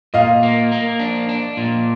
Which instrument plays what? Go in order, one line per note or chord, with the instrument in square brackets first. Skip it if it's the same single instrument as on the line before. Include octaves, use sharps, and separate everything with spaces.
[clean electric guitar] A#2 [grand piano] D#5 F5
[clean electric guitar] A#3
A#3
D4
D4
A#2